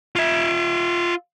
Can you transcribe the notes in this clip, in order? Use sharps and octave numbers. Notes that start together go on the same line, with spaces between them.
F4 E5